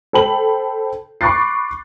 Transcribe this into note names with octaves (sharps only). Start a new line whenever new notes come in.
A4 C5 G5 B5 F#7
B5 C#6 D6 F#6 A6 C7